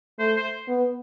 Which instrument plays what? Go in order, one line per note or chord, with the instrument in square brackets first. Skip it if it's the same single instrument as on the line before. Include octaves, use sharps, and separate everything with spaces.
[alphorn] A3 [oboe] C5
[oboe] C5
[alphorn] B3